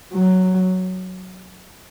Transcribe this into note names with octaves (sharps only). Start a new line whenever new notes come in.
F#3